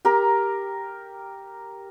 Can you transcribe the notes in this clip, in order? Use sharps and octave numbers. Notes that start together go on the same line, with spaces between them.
G4 A#4 A#5